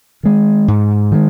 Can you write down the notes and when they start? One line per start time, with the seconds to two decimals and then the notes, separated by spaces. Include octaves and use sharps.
0.23 D#3 G#3
0.68 G#2
1.12 D#3 G#3